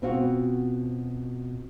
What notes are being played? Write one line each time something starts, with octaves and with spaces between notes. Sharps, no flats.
B2 C4 F4 F#4